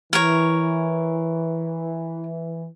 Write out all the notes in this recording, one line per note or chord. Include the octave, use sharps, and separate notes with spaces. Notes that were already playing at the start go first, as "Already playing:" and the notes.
E3 A#4 C#5